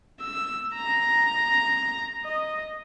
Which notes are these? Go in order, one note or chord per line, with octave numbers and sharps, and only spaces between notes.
E6
A#5
D#5